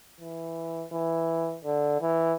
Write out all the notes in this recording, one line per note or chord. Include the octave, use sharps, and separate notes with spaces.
E3
E3
D3
E3